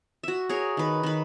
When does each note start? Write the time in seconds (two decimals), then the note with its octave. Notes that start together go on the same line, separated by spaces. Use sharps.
0.23 F#4 E5
0.49 G#4 A#4 C#5
0.77 D#3 B4
1.03 D#3 B4